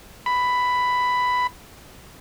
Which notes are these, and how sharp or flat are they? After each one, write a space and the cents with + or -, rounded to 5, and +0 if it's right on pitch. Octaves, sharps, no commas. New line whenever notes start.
B5 +10